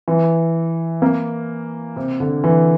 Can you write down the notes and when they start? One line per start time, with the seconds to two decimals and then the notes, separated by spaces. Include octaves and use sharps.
0.08 E3
1.02 A#3
1.96 C3
2.20 D3
2.44 E3